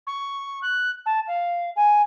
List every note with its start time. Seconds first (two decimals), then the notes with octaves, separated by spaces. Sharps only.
0.07 C#6
0.62 F#6
1.06 A5
1.27 F5
1.76 G#5